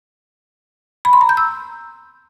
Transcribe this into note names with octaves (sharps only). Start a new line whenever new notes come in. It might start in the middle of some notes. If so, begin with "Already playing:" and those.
B5
C6
A#5
G6
E6